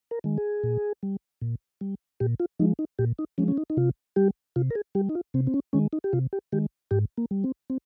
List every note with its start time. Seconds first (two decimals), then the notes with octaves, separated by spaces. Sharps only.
0.11 A#4
0.24 D#3 G#3
0.38 G#4
0.64 A#2
1.03 G3
1.41 A#2
1.81 G3
2.20 A#2 G4
2.40 F4
2.60 F3 G#3 D#4
2.79 D#4
2.99 A#2 G4
3.19 D#4
3.38 F3 G#3 C#4
3.48 C#4
3.57 D#4
3.70 D#4
3.77 C3 F4
4.16 G3 G4
4.56 C3 F4
4.70 A#4
4.75 G#4
4.95 G3 G4
5.09 D#4
5.15 F4
5.34 C3 C4
5.47 C4
5.54 C#4
5.73 D#3 G#3 C#4
5.93 D#4
6.04 G4
6.13 C3 F4
6.33 G4
6.52 D#3 G#3 G4
6.91 G#2 G4
7.18 A#3
7.31 G3
7.44 C4
7.70 C4